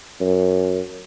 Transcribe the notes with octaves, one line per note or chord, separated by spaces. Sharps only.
F#2